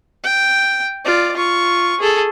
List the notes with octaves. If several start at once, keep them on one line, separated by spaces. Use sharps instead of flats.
G5
F4 D5
F4 C#6
G#4 A4